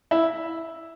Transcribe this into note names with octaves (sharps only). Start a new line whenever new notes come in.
E4